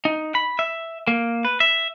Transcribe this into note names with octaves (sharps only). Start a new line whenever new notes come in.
D#4
B5
E5
A#3
B4
E5